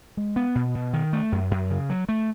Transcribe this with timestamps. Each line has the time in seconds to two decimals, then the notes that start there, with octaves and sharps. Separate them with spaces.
0.17 G#3
0.36 B3
0.55 B2
0.75 B2
0.93 D#3
1.13 A3
1.32 F#2
1.51 F#2
1.70 C#3
1.90 F#3
2.09 A3